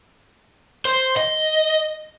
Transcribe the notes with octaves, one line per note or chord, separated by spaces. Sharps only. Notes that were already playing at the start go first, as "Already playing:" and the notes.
C5
D#5